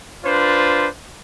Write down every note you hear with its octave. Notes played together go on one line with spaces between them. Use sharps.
D4 F4 B4 C5